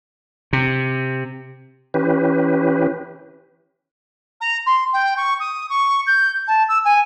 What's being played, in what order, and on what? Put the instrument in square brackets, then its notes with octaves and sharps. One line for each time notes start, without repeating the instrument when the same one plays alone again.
[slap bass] C3
[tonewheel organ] E3 C#4 G4 B4
[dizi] A#5
C6
G5
C#6
D#6
C#6
G6
A5
E6
G#5